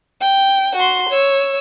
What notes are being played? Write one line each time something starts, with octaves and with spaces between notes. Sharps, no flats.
G5
F#4 C6
C#5 E6